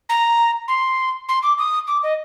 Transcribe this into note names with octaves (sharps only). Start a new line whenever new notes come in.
A#5
C6
C6
D6
D#6
D6
D#5